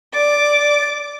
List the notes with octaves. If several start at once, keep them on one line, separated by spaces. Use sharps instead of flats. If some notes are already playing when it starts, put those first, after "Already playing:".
D5 D6